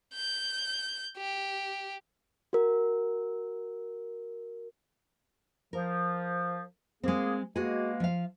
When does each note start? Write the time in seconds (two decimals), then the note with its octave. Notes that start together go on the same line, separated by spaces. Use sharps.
0.15 G6
1.17 G4
2.53 F#4 A#4
5.73 F3 A#4
7.03 G#3 A#3 C4 G#4
7.56 B2 G#3 A#3 F#4 G#4
8.00 F3 F5